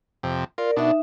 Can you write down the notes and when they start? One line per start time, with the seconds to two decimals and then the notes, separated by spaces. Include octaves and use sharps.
0.23 F2 C3
0.58 F4 A#4 D5
0.77 B2 D4 D#4 E5